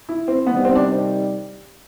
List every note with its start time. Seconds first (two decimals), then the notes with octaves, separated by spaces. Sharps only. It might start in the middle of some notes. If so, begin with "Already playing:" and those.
0.09 E4
0.28 C4
0.47 C3 D#3 G3 B3
0.65 C4
0.75 D4